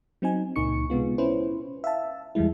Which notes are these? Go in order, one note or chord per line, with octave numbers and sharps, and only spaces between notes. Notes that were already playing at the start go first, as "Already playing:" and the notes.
F#3 C4 D#4 G#5
C#2 A#2 A#3 D#4 C#6 C#7
C3 G#3 B3 F4
C#4 E4 B4 C5
E5 F5 A5
E2 E3 G3 G#3 E4